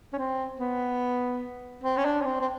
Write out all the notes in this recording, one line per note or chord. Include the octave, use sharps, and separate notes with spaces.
C#4
C4
B3
C4
C#4
D4
C#4
C4
C4